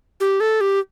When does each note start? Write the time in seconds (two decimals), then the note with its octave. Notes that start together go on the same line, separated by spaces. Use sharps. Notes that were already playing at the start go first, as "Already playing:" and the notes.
0.20 G4
0.40 A4
0.61 G4